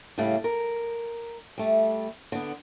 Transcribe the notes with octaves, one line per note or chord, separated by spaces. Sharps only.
A2 C#3 G3 A3 F5
A#4
G3 A3
D3 B3